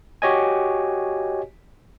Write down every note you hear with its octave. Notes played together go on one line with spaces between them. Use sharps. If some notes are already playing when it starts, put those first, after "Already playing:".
F#4 G4 C#5 D#5 G#5